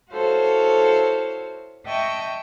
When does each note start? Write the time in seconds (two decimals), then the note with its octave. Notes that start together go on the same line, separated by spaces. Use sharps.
0.13 E4 F#4 A4 C5 C#5 F5
1.86 D#5 E5 G5 A5 C#6 D#6